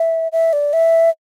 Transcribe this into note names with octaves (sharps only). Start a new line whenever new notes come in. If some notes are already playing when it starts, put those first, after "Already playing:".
Already playing: E5
E5
D5
E5